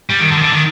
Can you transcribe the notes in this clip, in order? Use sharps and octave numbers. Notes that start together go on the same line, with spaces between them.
G3
D#3
D3
D#3
D3
D#3